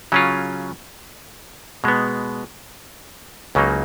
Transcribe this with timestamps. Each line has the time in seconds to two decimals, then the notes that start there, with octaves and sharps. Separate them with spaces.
0.12 C#3 F#3 C#4 F4
1.84 B2 G#3 B3
3.55 C#2 C#3 F#3 A#3 D#4